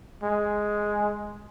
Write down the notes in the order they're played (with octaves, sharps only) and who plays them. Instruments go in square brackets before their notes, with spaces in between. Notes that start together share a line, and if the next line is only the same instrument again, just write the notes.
[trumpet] G#3